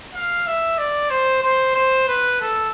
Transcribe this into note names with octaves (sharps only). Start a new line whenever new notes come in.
F5
E5
D5
C5
C5
C5
B4
A4